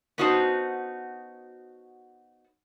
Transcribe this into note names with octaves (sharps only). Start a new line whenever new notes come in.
B3 C#4 D#4 F#4 C5 A5